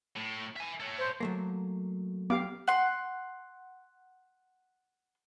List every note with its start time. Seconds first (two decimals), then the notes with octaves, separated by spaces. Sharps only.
0.16 A2
0.56 E5 G#5
0.80 A4 C#5
0.98 C5
1.20 F#3 A3 A#3
2.30 B3 G4 F5 D6
2.67 F#5 C6